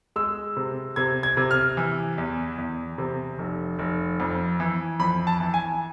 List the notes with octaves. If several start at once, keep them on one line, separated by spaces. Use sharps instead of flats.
G#3 E6
C3
C3 G#6
G#6
C3
F6
E3
E2
E2
C3
F1
F1
F2
E3
F2 B5
A5
E3
G#5